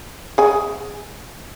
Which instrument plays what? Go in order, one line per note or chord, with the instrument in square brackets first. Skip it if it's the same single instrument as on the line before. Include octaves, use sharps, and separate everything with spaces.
[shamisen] G#4 G#5